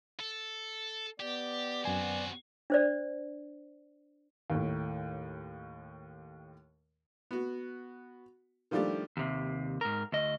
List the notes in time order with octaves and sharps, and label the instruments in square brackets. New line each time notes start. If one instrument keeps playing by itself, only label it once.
[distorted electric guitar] A4
[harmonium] B3 D5 [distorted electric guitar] G4
[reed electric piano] F#2 G#5 [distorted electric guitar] C4 F#4
[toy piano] D4 C5 D5
[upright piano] D#2 A2
[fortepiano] B3 F#4
D#3 F3 G3 A3 D4 G4
[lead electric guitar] D#2 C3
G#2 A#4
D2 D#5